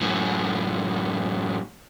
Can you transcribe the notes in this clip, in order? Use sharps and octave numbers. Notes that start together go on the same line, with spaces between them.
F#2 A2